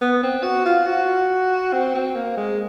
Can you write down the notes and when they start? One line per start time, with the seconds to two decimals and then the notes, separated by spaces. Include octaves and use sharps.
0.01 B3
0.23 C4
0.43 F#4
0.65 F4
0.86 F#4
1.73 C4
1.95 C4
2.16 A#3
2.37 G#3